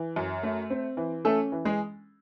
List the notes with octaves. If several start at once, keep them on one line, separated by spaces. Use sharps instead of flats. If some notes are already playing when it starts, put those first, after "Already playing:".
Already playing: E3
F#2
A3
C4
E3
A3 C#4 A4
E3
G#3 G#4